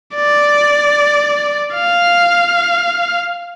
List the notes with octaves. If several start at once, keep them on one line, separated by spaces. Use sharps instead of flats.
D5
F5